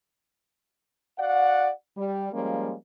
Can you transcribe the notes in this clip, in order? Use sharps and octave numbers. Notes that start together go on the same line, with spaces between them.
F#4 D5 F5 F#5
G3
F3 G3 G#3 A#3 C#4